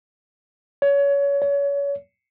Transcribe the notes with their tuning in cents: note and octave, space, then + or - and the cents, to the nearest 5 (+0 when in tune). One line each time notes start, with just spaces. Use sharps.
C#5 +25
C#5 +30